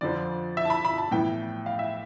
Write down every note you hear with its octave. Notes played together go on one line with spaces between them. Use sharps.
F2 D3 F3 D5
E5
A5
B5
B5
A5
A2 E3 B3 E4 G5
F5
E5